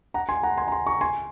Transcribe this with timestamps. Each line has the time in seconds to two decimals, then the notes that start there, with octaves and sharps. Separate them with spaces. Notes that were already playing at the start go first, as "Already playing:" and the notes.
0.14 F#5 A#5
0.29 G#5 C6
0.43 F#5 A#5
0.58 G#5 C6
0.68 A#5
0.72 G#5 C6
0.87 A#5 C#6
1.01 G#5 C6